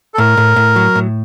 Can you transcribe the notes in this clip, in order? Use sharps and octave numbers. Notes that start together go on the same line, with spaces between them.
A4
A2 A#4
A2
A2
F#3
A2